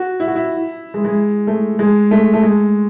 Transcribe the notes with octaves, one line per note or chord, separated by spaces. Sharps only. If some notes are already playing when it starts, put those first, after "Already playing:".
Already playing: F#4
E4
F#4
E4
G#3
G#3
A3
G#3
A3
A3
G#3